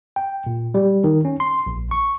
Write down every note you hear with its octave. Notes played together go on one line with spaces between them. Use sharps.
G5
A#2
G3
D#3
C#4
C6
A#1
C#6